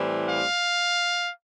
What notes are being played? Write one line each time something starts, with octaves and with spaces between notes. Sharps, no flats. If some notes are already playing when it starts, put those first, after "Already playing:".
Already playing: A2 E3 G3 C4
F5